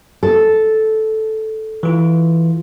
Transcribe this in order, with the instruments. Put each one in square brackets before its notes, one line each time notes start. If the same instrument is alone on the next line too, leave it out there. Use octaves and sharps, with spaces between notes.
[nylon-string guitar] A4
[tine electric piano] E3 F4